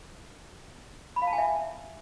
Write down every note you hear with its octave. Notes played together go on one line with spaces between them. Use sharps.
B5
F5
A5
G#5
E5